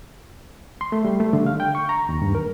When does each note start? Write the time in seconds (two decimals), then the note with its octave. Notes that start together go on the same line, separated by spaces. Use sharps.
0.81 C6
0.92 A3
1.05 G3
1.20 A3
1.33 D3
1.46 F5
1.60 G5
1.75 C#6
1.89 A#5
2.09 D#2
2.22 G2
2.35 A#4